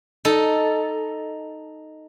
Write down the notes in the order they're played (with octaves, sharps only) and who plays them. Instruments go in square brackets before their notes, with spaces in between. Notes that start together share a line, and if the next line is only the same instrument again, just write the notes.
[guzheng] D#4 A4